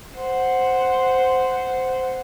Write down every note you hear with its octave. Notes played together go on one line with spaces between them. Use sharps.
C5 F#5